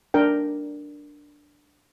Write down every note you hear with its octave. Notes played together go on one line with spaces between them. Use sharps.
D4 A#4 G5